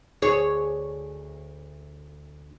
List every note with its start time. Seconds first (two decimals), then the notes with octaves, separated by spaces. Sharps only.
0.22 D2 G#4 C#5